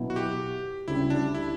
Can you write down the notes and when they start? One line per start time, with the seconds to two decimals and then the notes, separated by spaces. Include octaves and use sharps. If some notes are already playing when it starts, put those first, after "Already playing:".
Already playing: B2 F#3 B3 E4
0.10 F#4
0.16 G4
0.88 D2 C#3 G3 E4
1.10 D4
1.34 E4